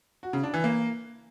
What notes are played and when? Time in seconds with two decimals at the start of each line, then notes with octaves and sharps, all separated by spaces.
0.23 F#4
0.33 C#3
0.43 D4
0.54 E3
0.64 A#3